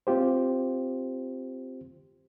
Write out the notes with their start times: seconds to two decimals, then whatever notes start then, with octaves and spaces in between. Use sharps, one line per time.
0.07 C4 F4 G4 C5